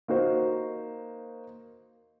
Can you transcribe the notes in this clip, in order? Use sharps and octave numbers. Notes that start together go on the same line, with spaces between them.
A#3 D#4 F#4 C5